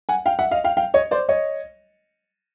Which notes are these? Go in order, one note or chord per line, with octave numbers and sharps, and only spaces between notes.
F#5 G#5
F5 G5
E5 F#5
D#5 F5
F5 G5
F5 G5
C#5 D#5
C5 D5
C#5 D#5